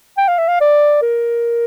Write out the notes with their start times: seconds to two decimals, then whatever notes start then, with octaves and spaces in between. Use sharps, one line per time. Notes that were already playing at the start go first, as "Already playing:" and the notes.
0.18 G5
0.28 F5
0.38 E5
0.48 F5
0.61 D5
1.02 A#4